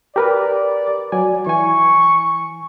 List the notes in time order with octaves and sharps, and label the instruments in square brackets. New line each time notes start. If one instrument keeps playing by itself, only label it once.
[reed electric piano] G4 A#4 B4 [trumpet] D5
[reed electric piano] F#3 D5 G#5
[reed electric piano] E3 G#5 [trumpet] C#6